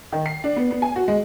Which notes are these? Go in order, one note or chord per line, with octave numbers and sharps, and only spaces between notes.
D#3
C7
D4
B3
B3
G#5
F#4
G#3